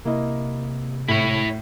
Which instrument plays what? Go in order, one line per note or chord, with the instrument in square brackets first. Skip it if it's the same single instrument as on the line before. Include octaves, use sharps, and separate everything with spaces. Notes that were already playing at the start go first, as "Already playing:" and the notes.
[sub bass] C3 [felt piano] A#3 E4 D#5
[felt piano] A2 [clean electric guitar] E4 C#5